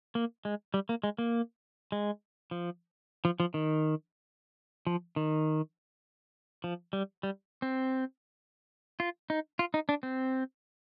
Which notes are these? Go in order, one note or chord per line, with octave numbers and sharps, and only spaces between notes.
A#3
G#3
G3
A#3
G#3
A#3
G#3
F3
F3
F3
D#3
F3
D#3
F3
G3
G3
C4
F4
D#4
F4
D#4
D4
C4